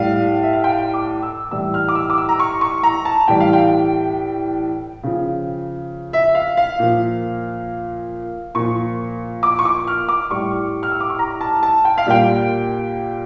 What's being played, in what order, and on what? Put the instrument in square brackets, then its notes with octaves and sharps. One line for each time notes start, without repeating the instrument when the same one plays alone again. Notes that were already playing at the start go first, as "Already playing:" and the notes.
Already playing: [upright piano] A2 G3 F5
E5
F5
G5
D6
E6
A2 E3 G3 E6
F6
D6
E6
D6
E6
A#5
C#6
C#6
A#5
A5
A2 E3 G3 G5
F5
G5
C#3 F3
E5
F5
F5
A#2 F3
A#2 F3 C#6
D6
C#6
D6
F6
D6
A2 G3 C#6
F6
E6
D6
C#6
A#5
A5
A5
G5
F5
A#2 G3 G5